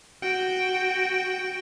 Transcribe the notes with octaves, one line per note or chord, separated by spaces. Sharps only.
F#4 G5